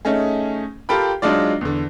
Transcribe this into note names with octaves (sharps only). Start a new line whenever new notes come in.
A3 C#4 D#4 G#4
F4 G4 A4 A#4 G5 B5
F#3 G#3 D4 D#4 F4 D5
E2 D3